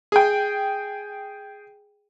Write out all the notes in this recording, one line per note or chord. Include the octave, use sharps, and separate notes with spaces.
G#4 G5